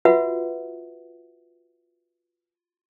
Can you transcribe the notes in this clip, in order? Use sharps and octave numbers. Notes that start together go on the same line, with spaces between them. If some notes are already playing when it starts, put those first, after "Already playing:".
F4 F#4 B4 E5 F#5